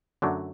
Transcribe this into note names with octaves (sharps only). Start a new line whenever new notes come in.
F#2 D3 F#3 A3 D4